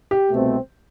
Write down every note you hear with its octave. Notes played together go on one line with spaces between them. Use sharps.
G4
C2 B2 A3 C4